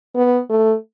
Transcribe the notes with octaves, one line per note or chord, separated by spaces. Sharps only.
B3
A3